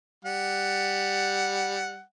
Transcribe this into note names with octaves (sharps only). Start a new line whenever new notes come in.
G3 F#5